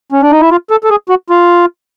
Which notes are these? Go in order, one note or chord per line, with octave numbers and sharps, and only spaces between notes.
C#4
D4
D#4
E4
F4
A4
A4
G#4
F#4
F4